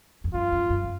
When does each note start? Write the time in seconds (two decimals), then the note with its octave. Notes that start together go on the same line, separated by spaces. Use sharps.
0.24 F2
0.34 F#2 F4
0.52 F#2
0.70 F#2
0.84 C#3